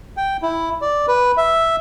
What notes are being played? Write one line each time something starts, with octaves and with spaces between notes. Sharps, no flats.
G5
E4
D5
B4
E5